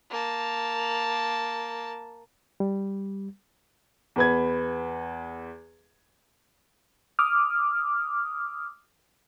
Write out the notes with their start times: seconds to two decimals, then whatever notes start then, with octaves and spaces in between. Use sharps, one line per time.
0.10 A#3 A5
2.60 G3
4.16 E2 B4 G#6
7.19 D6 D#6 F6